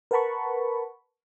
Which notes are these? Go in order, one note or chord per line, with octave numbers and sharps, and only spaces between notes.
A#4 B4 F#5 A5 B5 C#6